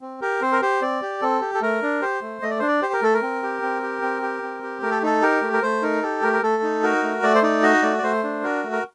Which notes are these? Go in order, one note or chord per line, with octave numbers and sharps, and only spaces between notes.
C4
G4 A#4
C4 C5
A#4
G4 C5
C4 D5
G4
C4 A4
G4
A4
A3 A#4
D4
G4 C5
A3
A3 D#5
D5
D4 C5
D5
G4 C5
A#4
A3 A4
A#4
C4
G4
C4
G4
C4
G4
C4
G4
A3 A#4
A4
D#4 A4
G4 A#4
A3
A#4
A3 C5
D#4 A#4
G4 A4
A3 A#4
A#4
A3 A4
D#4
F#4 A#4
A3
A3 D5
C5
D#4 D5
F#4 D#5
A3 D5
D5
A3 C5
D4
F#4 A#4
A3
A#4